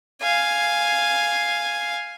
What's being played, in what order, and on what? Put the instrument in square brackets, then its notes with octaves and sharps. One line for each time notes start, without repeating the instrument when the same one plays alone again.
[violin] F5 G#5